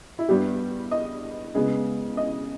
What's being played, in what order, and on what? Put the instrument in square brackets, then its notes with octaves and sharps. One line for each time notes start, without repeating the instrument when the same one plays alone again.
[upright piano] E4
G2 G3 B3 G4
D#5
C#3 G#3 B3
D#5